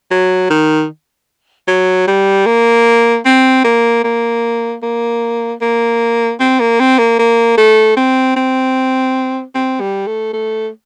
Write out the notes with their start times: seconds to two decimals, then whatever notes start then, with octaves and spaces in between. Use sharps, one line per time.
0.11 F#3
0.50 D#3
1.68 F#3
2.07 G3
2.46 A#3
3.25 C4
3.64 A#3
4.04 A#3
4.83 A#3
5.61 A#3
6.39 C4
6.60 A#3
6.80 C4
6.98 A#3
7.19 A#3
7.58 A3
7.97 C4
8.36 C4
9.55 C4
9.80 G3
10.07 A3
10.33 A3